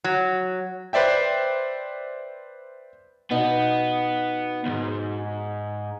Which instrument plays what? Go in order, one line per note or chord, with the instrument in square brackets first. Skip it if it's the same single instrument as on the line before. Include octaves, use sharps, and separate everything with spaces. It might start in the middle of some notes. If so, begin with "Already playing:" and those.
[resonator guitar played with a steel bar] F#3
[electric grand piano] B4 C5 D5 E5 G5
[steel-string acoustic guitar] B2 D#4 F#4 [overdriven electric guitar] B3
[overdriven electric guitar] C#2 G#2